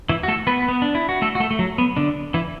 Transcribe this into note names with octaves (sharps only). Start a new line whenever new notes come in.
E3 E4
F#4
A3 A4
B3 B4
B3
D4
E4
F#4
A3 A4
F#4
A3 A4
A3
F#3
B3
D3 D4
E3 E4